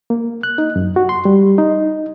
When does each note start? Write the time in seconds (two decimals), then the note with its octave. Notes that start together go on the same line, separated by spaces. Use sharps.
0.10 A#3
0.43 F#6
0.58 D#4
0.76 F#2
0.96 F#4
1.09 C6
1.25 G3
1.58 D#4